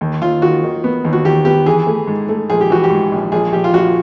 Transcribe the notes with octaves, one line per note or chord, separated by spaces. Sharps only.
D#2
D#2 F4
D#3 F#4
D#3
B3
D#2
F#4
D#2 G4
B3 G4
E3 G#4
A3
G#2
A3
A#1 G#4
G4
E3 F#4
G4
G#2
A#1
A#1 G#4
A#1 G4
F4
A#1 F#4